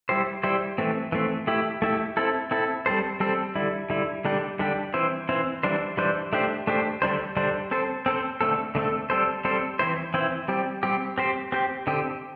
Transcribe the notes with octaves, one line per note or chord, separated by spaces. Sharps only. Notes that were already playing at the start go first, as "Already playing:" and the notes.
G3 E4 G4 C5
G3 E4 G4 C5
E3 A3 C4
E3 A3 C4
A3 E4 G4
A3 E4 G4
C4 E4 A4
C4 E4 A4
G3 C4 A4 C5
G3 C4 A4 C5
D3 G3 E4
D3 G3 E4
D3 G3 D4 G4
D3 G3 D4 G4
E3 C4 E4 C5
E3 C4 E4 C5
E3 G3 D4 C5
E3 G3 D4 C5
A3 D4 G4 C5
A3 D4 G4 C5
D3 G3 D4 C5
D3 G3 D4 C5
C4 A4 C5
C4 A4 C5
D3 A3 C4 A4
D3 A3 C4 A4
G3 C4 A4 C5
G3 C4 A4 C5
E3 C4 E4 C5
E3 C4 E4 C5
G3 C4 G4
G3 C4 G4
C4 G4 C5
C4 G4 C5
D3 C4 G4